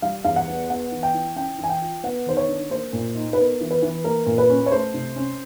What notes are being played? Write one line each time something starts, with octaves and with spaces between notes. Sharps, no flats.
G3 F5
E2 F5
F#5
B3
B3 F#5
E3
G5
E4
C#4 G5
E3
G#5
G5
F4
B3 F#5
D#3 C5
C#5
D4
A#3 C5
A#2
D#4
B4
B3 A#4
E3
B4
E3
A#3 A#4
A#2
B4
C#4
C#5
A3 C5
C3
C#4